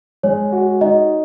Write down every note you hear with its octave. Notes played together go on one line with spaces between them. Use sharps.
G#3 C#5
F#4
D#4 D#5